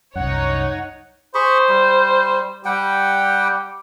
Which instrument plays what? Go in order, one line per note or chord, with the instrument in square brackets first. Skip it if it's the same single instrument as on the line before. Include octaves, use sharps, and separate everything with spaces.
[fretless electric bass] C2 F#2 [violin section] D#4 C#5 [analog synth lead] F#5
[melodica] G#4 B5 C#6 [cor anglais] C5
[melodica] G3
[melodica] G3 F#5 G5 [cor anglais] G4